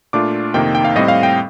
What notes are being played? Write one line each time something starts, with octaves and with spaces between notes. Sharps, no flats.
A#2 A3 D4 F4 D6
F2 C3 D#3 A#3 D#4 G5
G5
F5
A2 G3 C4 D#5
F5
G5